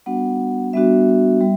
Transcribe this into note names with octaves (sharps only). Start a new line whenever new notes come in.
G3 B3 D4 F#4 F#5
G3 B3 D4 F#4 E5
G3